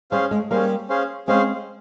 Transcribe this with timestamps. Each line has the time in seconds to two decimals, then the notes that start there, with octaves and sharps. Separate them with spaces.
0.11 G3 C#4 G#4 C5 F5
0.31 G#3
0.51 G3 A#3 C#4 G#4 C5 F5
0.89 C#4 G#4 C5 F5
1.28 G#3 C4 C#4 G#4 C5 F5